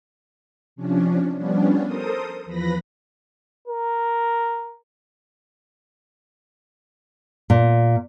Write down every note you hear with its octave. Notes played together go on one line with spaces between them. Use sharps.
C3 F3 C#4 D4
F3 G3 B3 C#4 D4
A4 A#4 C5 D#6
E2 F3 B4 B5 A#6
A#4
A#2